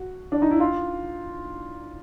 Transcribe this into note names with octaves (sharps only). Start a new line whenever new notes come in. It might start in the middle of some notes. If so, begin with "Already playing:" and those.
Already playing: F#4
D4
D#4
E4
F4